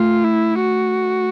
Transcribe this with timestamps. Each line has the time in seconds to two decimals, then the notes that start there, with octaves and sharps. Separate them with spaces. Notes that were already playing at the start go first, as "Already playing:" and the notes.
Already playing: A3 F4
0.24 E4
0.61 F#4